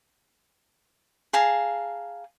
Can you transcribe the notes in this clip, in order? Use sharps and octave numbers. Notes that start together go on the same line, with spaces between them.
G#4 F5 A5 A#5